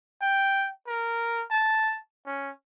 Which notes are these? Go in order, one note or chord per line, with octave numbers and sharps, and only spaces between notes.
G5
A#4
A5
C#4